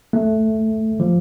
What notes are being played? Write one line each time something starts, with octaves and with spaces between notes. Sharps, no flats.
A3
F3